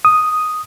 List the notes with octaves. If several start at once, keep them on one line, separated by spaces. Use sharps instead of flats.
D#6